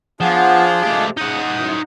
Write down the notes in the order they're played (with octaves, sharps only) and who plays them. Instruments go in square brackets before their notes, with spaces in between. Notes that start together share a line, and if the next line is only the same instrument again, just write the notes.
[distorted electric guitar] F3 [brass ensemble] B3 F#5 [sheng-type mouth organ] D4 F4 G#4
[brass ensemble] C3 G#3 [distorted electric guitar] A3 G4
[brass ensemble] C#3 [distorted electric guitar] D#4 F#5 [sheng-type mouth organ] D#6
[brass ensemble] F#2 E3